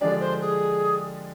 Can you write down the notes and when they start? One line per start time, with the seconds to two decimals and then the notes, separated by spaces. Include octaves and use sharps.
0.01 D3 F3 G#3 D4 G4 D5
0.20 C5
0.40 G#4